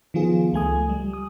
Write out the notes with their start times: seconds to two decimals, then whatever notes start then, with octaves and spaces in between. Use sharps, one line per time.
0.14 D#3 F3 B3 F4 G#4
0.53 C#2 A3 G#5 D#6
0.89 G3
1.13 D#6